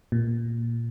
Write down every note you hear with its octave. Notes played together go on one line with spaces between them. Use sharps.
A#2